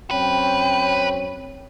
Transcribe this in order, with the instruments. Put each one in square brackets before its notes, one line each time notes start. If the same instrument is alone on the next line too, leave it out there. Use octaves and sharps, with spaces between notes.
[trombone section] F#2 C4 [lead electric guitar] B4 [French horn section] C#5 [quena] G5